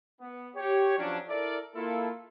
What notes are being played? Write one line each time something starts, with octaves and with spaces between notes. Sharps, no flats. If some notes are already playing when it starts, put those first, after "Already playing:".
B3
G4 C#5
F3 F#3 C#4 D4
E4 A4 A#4 D5
A#3 E4 F4 A4